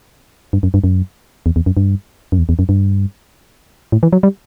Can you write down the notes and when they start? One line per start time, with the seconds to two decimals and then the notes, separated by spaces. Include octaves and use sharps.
0.53 G2
0.63 F#2
0.74 G2
0.84 F#2
1.46 E2
1.56 E2
1.66 F#2
1.77 G2
2.32 F#2
2.38 E2
2.49 E2
2.59 F#2
2.69 G2
3.92 A2
4.03 E3
4.13 F#3
4.23 G3